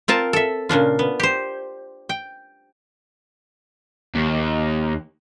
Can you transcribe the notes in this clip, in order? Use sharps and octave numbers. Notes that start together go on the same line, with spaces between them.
C4 F4 A#4 A5
A4 E5
A#2 C#3 D4 F4
B3
G4 C5
G5
D#2